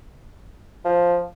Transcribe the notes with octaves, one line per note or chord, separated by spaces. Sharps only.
F3